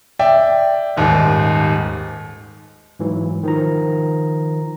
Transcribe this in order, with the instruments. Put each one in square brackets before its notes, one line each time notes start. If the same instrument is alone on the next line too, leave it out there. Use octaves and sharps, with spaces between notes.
[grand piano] D5 E5 G5
D#1 D#2 G#2
[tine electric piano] G#2 E3 F#3
D#3 F3 A#5